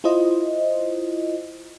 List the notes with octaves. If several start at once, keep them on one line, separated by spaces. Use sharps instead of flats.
E4 F4 C5 D#5